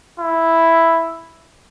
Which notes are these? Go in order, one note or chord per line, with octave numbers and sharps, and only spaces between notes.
E4